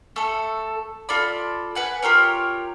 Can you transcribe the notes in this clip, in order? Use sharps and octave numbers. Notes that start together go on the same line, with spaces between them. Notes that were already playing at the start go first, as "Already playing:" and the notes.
A3 A4
F4 A4 D5 B5
B4 F#5 G#5
F4 G4 A#4 C#5